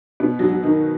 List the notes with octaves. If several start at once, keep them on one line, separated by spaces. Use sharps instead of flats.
B2 B3
F#3 F#4
F#3 F#4
D#3 D#4